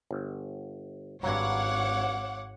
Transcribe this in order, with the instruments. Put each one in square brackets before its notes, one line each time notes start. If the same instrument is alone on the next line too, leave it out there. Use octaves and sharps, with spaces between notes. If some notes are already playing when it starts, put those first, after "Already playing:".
[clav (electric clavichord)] G1
[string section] G#1 C#5 F#5 [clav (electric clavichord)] G2 F#3 [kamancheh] F5 D6